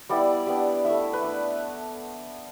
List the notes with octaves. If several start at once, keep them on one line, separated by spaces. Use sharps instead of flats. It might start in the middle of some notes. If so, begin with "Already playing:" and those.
G3 B3 E4 D5
G3 B3 D4
A3 E4 E5
B4
A3 D4